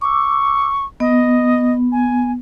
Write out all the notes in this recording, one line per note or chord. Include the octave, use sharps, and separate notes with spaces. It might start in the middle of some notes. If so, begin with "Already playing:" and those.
C#6 D6 E6
B3 D#5
G#5